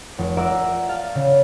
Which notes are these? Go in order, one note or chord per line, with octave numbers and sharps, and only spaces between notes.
F1
A#4 D5 E5 F#5
F5 A5
C#3